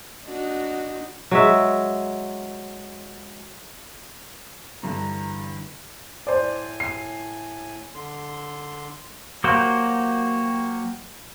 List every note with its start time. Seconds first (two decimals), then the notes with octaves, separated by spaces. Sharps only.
0.25 D4 D#4 F#4
1.31 F#3 G#3 E5
4.83 G2 D3 E3 A4 A#5
6.27 A2 C5 D5 G#5
6.80 C7
7.95 D3 C6
9.44 F#3 A#3 F#4 G4 C5